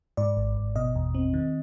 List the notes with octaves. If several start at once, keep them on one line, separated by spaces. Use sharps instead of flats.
G#2 D5
G#1
G#1
B2 D#5
E2
C4
D#3